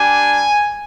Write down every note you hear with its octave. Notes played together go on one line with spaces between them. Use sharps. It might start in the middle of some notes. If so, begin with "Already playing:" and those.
Already playing: G3 D4 G4 G#5